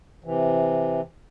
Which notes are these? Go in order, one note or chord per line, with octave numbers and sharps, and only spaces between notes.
C3 E3